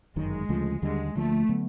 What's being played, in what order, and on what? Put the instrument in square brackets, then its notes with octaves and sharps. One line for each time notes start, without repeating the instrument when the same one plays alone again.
[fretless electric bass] G1 F#2 D#3 [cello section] G#3
[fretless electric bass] D2 C#3 F3 A3
[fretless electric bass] D#2 D3 G3 [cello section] G#3
[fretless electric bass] D2 D3 F3 A#3 [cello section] A3
[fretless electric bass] D3 F#3 B3